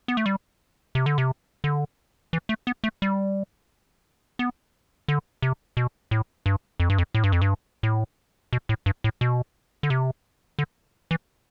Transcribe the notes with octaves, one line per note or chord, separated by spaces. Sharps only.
B3
A3
G3
C3
D3
C3
D3
E3
A3
B3
A3
G3
B3
D3
C3
B2
A2
G2
F2
G2
F2
A2
G2
F2
G2
A2
B2
A2
G2
A2
B2
D3
C3
D3
E3